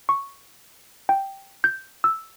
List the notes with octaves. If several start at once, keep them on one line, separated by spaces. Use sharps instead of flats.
C#6
G5
G6
E6